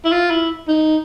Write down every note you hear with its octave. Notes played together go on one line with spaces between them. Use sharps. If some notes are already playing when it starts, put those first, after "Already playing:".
E4
F4
E4
D#4